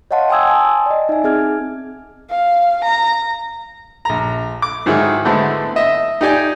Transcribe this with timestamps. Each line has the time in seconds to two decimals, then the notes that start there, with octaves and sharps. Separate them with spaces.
0.11 C#5 D#5 F5 F#5 A5 C6
0.30 G5 G#5 C6 D#6 E6 G#6
0.48 G#5 A5
0.86 D5 D#5
1.09 D#4 E5 G#5
1.24 C4 G#4 F6 G#6
2.30 F5
2.84 A#5
4.05 A#1 A#5
4.62 D6
4.86 G#2 D#3 F#3 E4 G#4
5.25 D3 G#3 A3 B3 C4 E4
5.76 D#5 E5
6.21 D#4 G4 D5 G#5